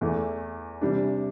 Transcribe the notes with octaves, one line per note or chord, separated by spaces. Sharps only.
E2 E3 A3
C3 E3 G3 D4